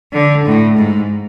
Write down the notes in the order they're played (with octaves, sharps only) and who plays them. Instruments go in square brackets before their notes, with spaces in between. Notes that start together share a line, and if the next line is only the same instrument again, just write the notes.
[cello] D3
A2
G#2